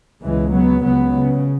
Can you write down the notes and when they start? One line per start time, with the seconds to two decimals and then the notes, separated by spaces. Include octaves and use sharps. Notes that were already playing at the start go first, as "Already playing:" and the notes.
0.21 C#2 B2 E3 G#3
0.52 F#3 B3
0.84 C#2 C#3 F#3 B3
1.15 C#3